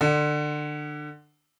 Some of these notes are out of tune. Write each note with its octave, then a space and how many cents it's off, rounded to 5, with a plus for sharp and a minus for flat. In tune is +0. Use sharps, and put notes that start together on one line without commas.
D3 +25